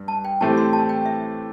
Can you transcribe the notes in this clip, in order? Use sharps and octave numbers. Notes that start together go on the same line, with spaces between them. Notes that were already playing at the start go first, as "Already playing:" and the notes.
Already playing: G2
A5
G5
A2 E3 A3 C4 G4 A5
C6
A5
G5
E5